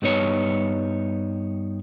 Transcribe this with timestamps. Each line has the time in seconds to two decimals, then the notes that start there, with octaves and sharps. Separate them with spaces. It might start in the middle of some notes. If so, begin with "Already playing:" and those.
0.02 G2 G3 B3 D#4 C#5